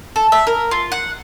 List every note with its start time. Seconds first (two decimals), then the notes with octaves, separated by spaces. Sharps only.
0.16 A4
0.32 E5
0.47 A#4
0.71 F4
0.92 F#5